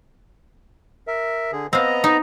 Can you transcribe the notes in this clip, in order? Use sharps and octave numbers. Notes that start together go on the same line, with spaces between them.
A#4 E5
D3 G#4
B3 C4 D#5 F5 A#5
D#4